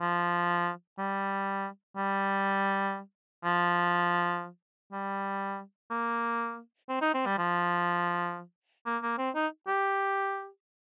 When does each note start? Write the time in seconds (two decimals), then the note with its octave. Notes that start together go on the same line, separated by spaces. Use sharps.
0.01 F3
0.98 G3
1.97 G3
3.44 F3
4.92 G3
5.91 A#3
6.89 C4
7.01 D#4
7.14 C4
7.26 G3
7.38 F3
8.86 A#3
9.02 A#3
9.18 C4
9.35 D#4
9.68 G4